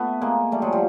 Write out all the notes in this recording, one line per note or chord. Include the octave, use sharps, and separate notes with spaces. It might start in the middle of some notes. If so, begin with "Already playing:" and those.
Already playing: A3 B3
G#3 A#3
G3 A3
F#3 G#3
F3 G3